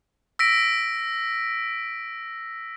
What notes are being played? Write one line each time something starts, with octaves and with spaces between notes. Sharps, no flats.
E6 A#6 B6 D7